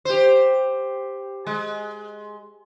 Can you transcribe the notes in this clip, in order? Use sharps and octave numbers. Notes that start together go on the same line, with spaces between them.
G4 C5
G#3